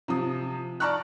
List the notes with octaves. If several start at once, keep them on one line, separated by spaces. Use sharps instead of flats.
C3 F3 D#6
D5 A5 A#5 C#6 F6 F#6